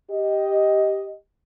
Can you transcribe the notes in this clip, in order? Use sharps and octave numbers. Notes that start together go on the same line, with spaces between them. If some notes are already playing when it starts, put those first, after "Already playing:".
G4 D#5